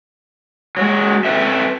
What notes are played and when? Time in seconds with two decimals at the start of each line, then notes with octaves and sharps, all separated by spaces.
0.77 F#3 G#3
1.25 C4 A4 B4 E5